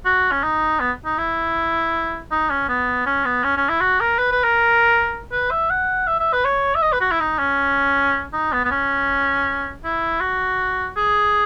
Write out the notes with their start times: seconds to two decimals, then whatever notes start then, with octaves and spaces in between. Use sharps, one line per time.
0.06 F#4
0.32 C#4
0.43 D#4
0.80 B3
1.05 D#4
1.18 E4
2.31 D#4
2.50 C#4
2.69 B3
3.06 C#4
3.25 B3
3.44 C#4
3.57 C#4
3.69 E4
3.81 F#4
4.00 A#4
4.19 B4
4.32 B4
4.44 A#4
5.32 B4
5.51 E5
5.70 F#5
6.07 E5
6.20 E5
6.33 B4
6.45 C#5
6.75 E5
6.82 D#5
6.93 B4
7.01 F#4
7.11 E4
7.20 D#4
7.39 C#4
8.33 D#4
8.53 B3
8.65 B3
8.71 C#4
9.84 E4
10.21 F#4
10.97 G#4